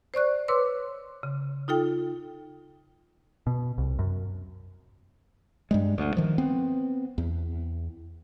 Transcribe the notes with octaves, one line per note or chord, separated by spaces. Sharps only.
C5 D5 C#6 F#6
B4 C#5 C6 D6 E6
C#3
D#4 F4 A4 G5
B2
C2
F#2
G2 G3 G#3
D2
D#3 F3
B3 C4
E2